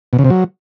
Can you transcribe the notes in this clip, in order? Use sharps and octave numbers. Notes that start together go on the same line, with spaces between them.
B2
C#3
C3
F#3